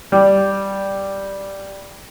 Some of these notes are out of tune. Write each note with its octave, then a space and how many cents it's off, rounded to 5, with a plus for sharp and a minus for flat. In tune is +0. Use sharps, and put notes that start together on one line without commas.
G3 +0